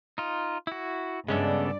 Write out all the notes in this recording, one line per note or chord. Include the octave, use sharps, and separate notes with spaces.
D#4 F4
E4 F#4
G2 C#3 G#3 B3 C#4 A4 D5 E5